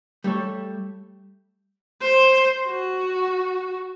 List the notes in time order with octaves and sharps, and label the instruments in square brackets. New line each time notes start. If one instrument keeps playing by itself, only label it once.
[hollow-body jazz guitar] G3 A3 A4 C#5
[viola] C5
F#4